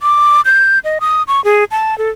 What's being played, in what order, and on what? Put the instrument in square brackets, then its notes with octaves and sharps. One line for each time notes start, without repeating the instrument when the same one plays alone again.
[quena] D6
G6
D#5
D#6
C#6
G#4
A5
A4